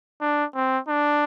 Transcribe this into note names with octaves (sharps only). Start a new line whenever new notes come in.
D4
C4
D4